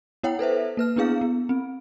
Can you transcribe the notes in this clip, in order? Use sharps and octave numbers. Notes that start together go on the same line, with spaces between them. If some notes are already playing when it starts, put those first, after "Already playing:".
B3 E4 C#5 F#5 G5
A4 B4 C5 E5
A#3 B4 F6
B3 D4 E4 G#4 F5
B3
C4